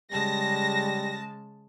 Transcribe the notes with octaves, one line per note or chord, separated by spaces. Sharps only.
C#3 G3 G#3 A5 A#6